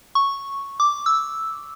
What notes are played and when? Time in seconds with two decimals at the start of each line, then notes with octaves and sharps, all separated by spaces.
0.15 C#6
0.80 D6
1.06 E6